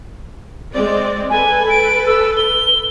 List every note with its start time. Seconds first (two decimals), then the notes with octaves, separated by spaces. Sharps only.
0.73 G#3 C4 D5
1.30 A4 B4 G#5
1.70 D7
2.07 E6
2.37 G7